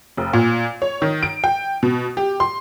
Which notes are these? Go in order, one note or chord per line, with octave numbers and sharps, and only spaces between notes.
F1
A#2
C#5
D#3
D7
G5
B2
G4
C6